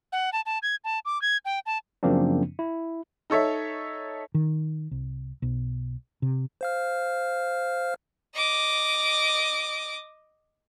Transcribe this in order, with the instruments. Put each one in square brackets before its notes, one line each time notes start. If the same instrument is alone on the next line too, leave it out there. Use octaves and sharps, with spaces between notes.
[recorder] F#5
A5
A5
G#6
A5
D6
G#6
G5
A5
[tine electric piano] F#2 C#3 F3 A#3 C4 D4
E4
[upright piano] D#4 A4 C#5 E5
[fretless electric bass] D#3
C2
B1
C3
[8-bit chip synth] C5 F5 F6
[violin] D#5 D6